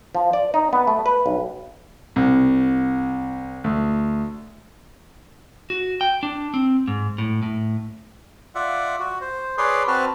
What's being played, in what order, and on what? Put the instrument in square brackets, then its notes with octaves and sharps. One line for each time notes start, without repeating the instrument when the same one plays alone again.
[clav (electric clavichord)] F3
D5
D#4
B3
A3
B4
B1
[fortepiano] C2
D2
[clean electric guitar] F#4
G5
D4
C4
G#2
A2
A2
[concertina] F4 D5 E5 F#5
F#4
C5
G#4 B4 C#5 D5 C6
C4 F#4 B4 A5 F6